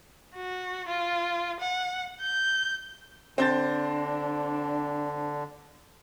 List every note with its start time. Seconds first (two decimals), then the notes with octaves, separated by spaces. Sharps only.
0.36 F#4
0.88 F4
1.60 F#5
2.21 G6
3.38 D3 C4 D4 G6 A6